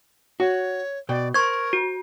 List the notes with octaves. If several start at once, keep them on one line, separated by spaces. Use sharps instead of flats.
F#4 C#5
B2 D5 G5
A#4 C5 C#6 G#6
F#4